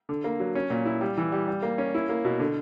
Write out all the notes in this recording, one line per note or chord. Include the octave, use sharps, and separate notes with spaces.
D3
A#3
F#3
C#4
A#2
E4
G3
E3
G3
G3
A#3
C#4
E4
A#3
B2
D3